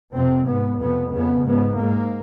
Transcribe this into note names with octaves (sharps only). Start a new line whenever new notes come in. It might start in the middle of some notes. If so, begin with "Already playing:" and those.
F2 C3 C4
G#2 B3
F2 C3 B3
F2 C#3 B3
G#2 B3
G#2 A#3